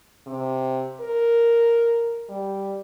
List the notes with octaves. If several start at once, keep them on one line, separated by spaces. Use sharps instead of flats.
C3
A#4
G3